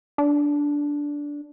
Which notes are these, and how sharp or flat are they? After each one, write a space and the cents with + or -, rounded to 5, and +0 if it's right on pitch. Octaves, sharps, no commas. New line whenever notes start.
D4 -10